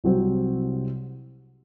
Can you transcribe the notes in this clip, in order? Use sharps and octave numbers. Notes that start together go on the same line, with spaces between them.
C2 C3 F#3 C4